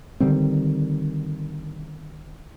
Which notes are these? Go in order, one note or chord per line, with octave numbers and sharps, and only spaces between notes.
D3 D#3 G3 C4